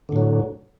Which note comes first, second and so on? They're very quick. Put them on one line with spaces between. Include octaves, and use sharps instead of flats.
D3 A2 F#3